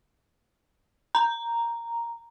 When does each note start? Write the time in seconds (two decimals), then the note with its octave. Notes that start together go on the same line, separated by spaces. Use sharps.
1.15 A#5